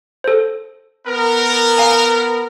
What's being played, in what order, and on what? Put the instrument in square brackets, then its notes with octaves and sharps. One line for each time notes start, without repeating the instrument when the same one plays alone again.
[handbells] A4 C5
[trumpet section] B3 A#4
[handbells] F5 G#5 A#5